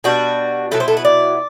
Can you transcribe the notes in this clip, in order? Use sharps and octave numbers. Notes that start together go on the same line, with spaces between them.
B2 G3 D4 F#4
B2 F#3 B3 E4 A4
C5
A4
B4
D5